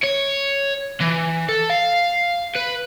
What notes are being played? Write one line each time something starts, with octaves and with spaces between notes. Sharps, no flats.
C#5
E3
A4
F5
B4